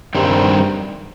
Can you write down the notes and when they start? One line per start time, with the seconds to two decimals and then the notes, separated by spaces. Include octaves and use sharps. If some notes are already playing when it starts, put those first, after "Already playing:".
0.15 G2 D#3 G3 C4